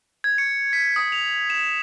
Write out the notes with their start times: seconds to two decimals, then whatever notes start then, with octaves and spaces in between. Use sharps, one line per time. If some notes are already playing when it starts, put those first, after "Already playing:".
0.24 G#6
0.38 C#7
0.73 B6
0.96 D#6
1.12 F7
1.50 E7